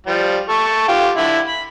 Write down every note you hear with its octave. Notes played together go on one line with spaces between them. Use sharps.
F3 G3
A4 C#6
F4 G4
D3 E4
B5